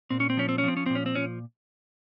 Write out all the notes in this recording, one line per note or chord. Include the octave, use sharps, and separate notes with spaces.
A#2 C4
C#4
C4
F3 C#4
C4
C#4
F3 C4
C#4
A#2 C4
C#4
C4
F3 C#4